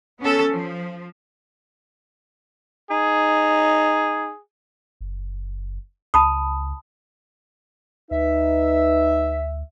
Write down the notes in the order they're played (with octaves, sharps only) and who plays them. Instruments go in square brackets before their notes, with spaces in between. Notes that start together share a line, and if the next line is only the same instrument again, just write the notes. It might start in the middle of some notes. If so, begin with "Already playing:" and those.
[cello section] B3 C#4 A4
F3
[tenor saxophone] D#4 [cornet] G#4
[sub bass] F#1
[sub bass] C#2 [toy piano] A5 B5 D#6
[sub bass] D2 [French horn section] D#4 B4 [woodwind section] E5